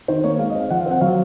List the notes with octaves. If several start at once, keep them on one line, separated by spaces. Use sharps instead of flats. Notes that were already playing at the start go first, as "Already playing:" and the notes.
D#3 C5
A#3 C#5
G#3 F5
D#5
C4 F5
F3 F#5
F5
C4
F#5
F#3 F5